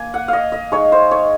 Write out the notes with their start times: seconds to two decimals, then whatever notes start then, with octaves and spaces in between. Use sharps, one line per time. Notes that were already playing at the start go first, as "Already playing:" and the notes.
Already playing: A#3 G#5
0.14 F#5
0.28 D#5 F5
0.52 D#5
0.72 G#3 D#4 C#5
0.92 C5
1.11 C#5